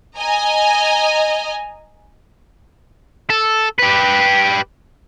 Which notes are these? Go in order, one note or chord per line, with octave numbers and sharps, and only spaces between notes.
D#5 G#5 A#5
A4
G4 B4